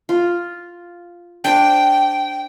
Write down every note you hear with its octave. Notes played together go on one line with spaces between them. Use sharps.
F4
D4 C5 G5